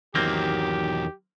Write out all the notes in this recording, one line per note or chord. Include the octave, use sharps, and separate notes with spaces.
E2 D#3 F#3 A#3 C4 G4